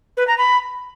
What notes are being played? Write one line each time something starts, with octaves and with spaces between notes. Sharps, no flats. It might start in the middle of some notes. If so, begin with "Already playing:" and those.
B4
A#5
B5